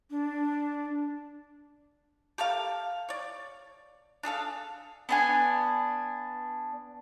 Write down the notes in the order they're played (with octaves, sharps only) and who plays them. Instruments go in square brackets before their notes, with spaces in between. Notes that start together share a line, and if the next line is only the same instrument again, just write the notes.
[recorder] D4
[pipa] G4 A4 A#4 F5
C#5 D5
D4 G#4 A4 F5
[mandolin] B3 D4 G#5